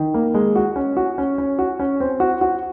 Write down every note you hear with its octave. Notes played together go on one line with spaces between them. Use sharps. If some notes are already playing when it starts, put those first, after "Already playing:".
Already playing: D#3
A#3
G#3
F#4
C#4
F#4
C#4
C#4
F#4
C#4
C4
F#4
F#4